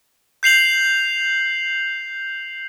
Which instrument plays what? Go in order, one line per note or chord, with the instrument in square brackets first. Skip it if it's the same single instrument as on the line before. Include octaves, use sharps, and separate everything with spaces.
[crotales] G6 C7 F7 F#7